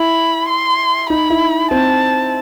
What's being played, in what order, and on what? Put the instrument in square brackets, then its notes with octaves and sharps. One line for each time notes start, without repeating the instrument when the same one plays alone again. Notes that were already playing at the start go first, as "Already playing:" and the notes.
Already playing: [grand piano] E4 [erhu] B5
[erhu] C6
[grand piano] D#4 [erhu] B5
[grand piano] E4
[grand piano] C4 [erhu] A5